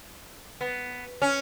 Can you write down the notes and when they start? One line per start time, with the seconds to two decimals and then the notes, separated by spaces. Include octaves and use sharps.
0.61 B3
1.22 C#4